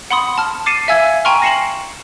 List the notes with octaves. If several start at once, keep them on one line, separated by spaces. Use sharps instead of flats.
F#5 B5 C6 D#6
A5 F6
D6 A6 C7 C#7 D#7 E7
E5 F5 G#5 E6 G#6
G5 G#5 A#5 C6 C#6 F6
A#6 C7 C#7 E7 F#7